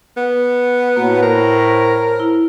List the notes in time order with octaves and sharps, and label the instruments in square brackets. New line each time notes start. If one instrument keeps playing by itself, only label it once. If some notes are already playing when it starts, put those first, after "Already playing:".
[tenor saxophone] B3
[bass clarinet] A2 [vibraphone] A#3 F#4 B4
[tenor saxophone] A#4 [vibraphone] C5
[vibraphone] E4